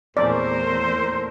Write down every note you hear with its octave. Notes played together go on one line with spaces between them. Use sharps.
E2 A#2 A3 C4 C#4 A#4 C5 D5